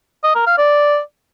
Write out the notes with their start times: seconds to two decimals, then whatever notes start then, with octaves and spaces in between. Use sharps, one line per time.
0.24 D#5
0.35 A#4
0.47 F5
0.58 D5